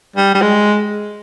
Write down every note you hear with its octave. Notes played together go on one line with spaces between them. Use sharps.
G3
G3
G#3